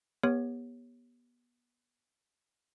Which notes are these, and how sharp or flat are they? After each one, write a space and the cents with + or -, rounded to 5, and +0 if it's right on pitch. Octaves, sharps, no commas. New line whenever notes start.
B3 -30 G4 +30 C#5 +0